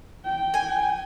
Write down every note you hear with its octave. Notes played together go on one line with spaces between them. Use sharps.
G5
G#5